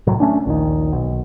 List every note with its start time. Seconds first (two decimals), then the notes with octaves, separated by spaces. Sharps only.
0.07 G1 C2 A2 F#3
0.20 A3 C#4 D4
0.46 A#1 D#2 D#3
0.92 B1